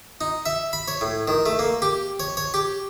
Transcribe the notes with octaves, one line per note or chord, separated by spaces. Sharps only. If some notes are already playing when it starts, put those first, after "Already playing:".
D#4
E5
B5
C#5
A2
D#3
A3
A#3
G4
C#5
C#5
G4